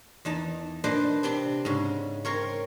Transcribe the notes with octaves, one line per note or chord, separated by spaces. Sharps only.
E2 D#4 A5
A#2 D4 B4 C5 D#5
C3 C4 D4 C6
G#2 C#3
C4 A#4 C#5